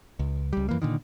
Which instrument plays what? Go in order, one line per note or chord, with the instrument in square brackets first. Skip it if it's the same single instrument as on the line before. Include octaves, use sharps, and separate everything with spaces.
[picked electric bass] C#2
C#2 G3
F#2 E3 A#3
A#2 D3 D#3